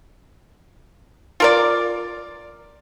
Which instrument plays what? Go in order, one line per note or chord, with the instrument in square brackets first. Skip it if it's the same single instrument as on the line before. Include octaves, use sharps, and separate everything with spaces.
[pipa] F4 A#4 D5